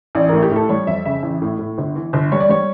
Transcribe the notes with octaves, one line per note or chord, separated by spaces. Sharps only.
A1 D5
A2 A#4
G4
A2 A4
G3 C#5
F2 E5
C#3 E5
A1
A2
A2
G1
E3
G1
G3 C#5
D5
G3 C#5